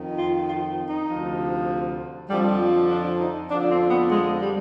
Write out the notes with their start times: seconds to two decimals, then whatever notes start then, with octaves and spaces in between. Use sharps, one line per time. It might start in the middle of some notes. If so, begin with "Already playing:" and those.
Already playing: F2 D#3
0.18 F4
0.49 F4
0.89 D#4
1.09 D2 C3 F3
2.30 F2 D3 F3 G3
2.90 D4
3.20 D#4
3.51 F2 D3 F3 D4
3.71 C4
3.91 B3
4.11 G#3
4.42 G3